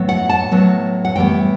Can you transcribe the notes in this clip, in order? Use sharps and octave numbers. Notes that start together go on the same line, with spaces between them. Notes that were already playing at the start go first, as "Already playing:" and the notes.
Already playing: A2 F#3 B3
F#5
A5
A2 F#3 B3
F#5
A2 E3 G3 B3 G5